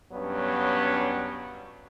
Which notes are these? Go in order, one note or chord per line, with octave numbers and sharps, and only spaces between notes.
G2 F#3 B3 C#4